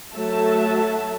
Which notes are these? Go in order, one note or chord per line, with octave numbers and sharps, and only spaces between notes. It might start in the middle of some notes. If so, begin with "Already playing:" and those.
F#3 A3 F#4 E5 A5